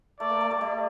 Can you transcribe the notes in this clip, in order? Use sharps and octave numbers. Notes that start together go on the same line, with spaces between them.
A3 D5
A#3
A3
G3
G3